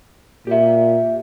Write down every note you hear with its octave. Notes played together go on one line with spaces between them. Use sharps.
A#2 G4 E5